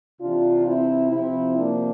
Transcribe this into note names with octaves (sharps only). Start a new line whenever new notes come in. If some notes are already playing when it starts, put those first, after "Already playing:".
C3 E3 D4 F4
C4 E4
C3 F3 C4 E4
A#3 D4